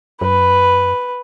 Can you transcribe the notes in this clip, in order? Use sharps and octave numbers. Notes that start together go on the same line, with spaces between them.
F#2 B4